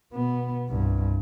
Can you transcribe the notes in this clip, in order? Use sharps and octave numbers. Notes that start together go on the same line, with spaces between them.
B2 B3
C2 G2